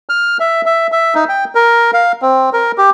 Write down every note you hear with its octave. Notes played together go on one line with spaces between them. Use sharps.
F6
E5
E5
E5
D#4
G5
A#4
F5
C4
A#4
G4